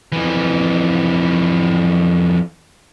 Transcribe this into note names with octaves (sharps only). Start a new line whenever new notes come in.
F2 E3